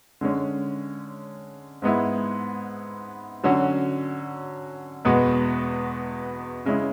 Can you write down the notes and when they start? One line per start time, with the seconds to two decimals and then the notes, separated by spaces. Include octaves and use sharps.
0.21 D3 G#3 C#4
1.82 G#2 G#3 B3 E4
3.44 D3 F#3 C#4 F#4
5.05 E2 B2 G#3 B3
6.65 C#3 G#3 C#4 E4